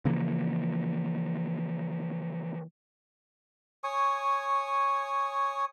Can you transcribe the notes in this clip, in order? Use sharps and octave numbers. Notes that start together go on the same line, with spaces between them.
C#3 E3 F3 A#3
C#5 G#5 C#6 D#6